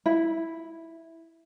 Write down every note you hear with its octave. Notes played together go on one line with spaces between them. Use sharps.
E4